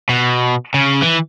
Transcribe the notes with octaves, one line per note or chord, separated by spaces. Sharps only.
B2
C#3
E3